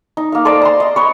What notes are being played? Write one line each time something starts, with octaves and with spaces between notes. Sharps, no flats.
D#4
A#3 F5
A4 C5 D5 D#5
A#5 C6
D#5
B4 C#5